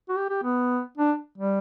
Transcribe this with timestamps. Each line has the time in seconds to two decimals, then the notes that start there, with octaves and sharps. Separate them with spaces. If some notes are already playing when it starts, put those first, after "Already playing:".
0.09 F#4
0.17 G4
0.30 G4
0.43 B3
0.97 D4
1.38 G3